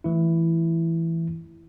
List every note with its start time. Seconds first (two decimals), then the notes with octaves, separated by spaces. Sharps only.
0.04 E3 A3 E4